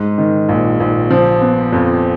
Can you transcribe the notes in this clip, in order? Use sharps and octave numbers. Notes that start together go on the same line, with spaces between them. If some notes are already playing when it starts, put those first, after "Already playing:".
Already playing: G#2
D#3
A#1
A#1
F3
B3
F2